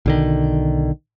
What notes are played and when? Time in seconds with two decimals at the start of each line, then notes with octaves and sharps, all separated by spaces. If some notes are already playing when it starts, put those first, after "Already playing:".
0.06 B1 D3 D#3